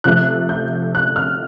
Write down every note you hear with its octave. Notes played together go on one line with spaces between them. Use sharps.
C3 F3 A3 F#6
G6
F#6
F6